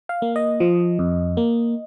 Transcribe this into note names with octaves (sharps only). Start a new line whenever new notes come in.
F5
A#3
D#5
F3
F2
A#3